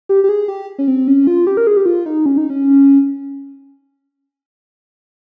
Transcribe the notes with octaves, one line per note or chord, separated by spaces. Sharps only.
G4
G4
G#4
G4
C#4
C4
C#4
F4
G4
A#4
G#4
G4
F4
D#4
C#4
D#4
C#4